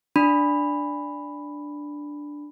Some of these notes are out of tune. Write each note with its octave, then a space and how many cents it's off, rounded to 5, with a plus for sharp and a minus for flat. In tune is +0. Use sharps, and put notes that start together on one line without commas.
D4 +0 B5 +0